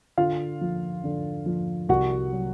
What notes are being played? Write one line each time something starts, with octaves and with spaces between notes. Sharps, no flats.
D3 F4 F5
F3
D3
F3
C2 F#4 F#5
F#3